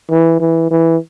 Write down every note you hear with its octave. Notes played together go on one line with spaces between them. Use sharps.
E3
E3
E3